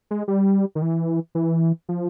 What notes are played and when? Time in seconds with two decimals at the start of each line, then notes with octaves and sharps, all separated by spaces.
0.11 G#3
0.28 G3
0.75 D#3
0.82 E3
1.35 E3
1.89 F3